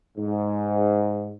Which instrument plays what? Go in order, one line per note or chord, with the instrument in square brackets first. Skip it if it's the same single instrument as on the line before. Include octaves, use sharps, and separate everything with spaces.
[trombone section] G#2